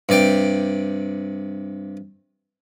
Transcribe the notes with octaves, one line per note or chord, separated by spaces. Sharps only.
G2 C3 D5 G5